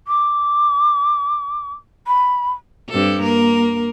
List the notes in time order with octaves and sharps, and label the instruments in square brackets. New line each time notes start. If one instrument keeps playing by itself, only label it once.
[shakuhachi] D6
B5
[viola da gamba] G2 C4 A4
A#3 A#4